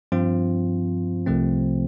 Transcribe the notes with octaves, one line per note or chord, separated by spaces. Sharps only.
G2 F3 C4 F4
C2 C3 F3 A3 C4